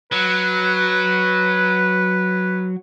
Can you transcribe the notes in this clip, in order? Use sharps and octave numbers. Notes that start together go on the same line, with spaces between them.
F#3 B4